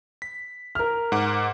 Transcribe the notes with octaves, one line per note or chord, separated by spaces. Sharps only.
B6
A#4 F6
G#2 F#5 D6